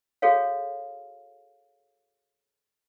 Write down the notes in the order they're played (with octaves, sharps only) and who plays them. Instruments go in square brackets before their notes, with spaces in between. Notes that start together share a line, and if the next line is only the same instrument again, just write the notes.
[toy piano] F#4 G#4 A4 C#5 F5